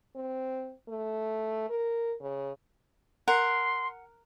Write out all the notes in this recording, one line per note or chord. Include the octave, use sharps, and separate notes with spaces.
C4
A3
A#4
C#3
A#4 F#5 C6